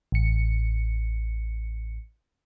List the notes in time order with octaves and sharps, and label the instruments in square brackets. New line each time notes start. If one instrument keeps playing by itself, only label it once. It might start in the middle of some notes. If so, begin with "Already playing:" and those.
[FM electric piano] A1 C#7